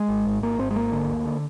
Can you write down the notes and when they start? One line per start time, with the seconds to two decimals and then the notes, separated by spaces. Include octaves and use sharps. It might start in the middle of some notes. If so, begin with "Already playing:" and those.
Already playing: G#3
0.09 G#1
0.26 G#2
0.42 G#1 A#3
0.59 G#2 C4
0.71 G#3
0.75 G#1 A#3
0.92 D3
1.08 D2
1.25 D3